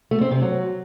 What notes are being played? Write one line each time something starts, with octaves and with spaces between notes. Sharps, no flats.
A3
C4
C3
F#3